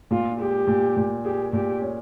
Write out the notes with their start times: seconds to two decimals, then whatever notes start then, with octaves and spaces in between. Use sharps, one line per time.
0.11 A#2 F4
0.40 G#3 G4
0.67 A#2
0.97 A#2
1.25 G4 G#4
1.53 A#2 G4
1.82 C#4